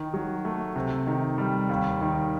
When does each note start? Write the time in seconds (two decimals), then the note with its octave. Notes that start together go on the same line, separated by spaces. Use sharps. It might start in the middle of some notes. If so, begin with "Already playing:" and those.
Already playing: D#3
0.14 F#3
0.45 A3
0.76 C3
1.07 D#3
1.38 G3
1.69 D#2
2.01 D#3